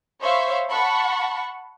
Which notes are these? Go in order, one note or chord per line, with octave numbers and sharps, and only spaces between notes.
C5 C#5 E5 F5 B5 C#6
F#5 A5 B5 C#6